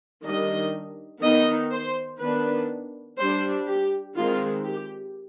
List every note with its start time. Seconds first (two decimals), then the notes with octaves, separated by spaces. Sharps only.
0.25 D#3 G3 D4 D#5
1.22 D#3 B3 D#4 D#5
1.72 C5
2.20 D#3 B3 D4 B4
3.18 G3 D4 C5
3.67 G4
4.16 D#3 G#3 C4 F4
4.64 G4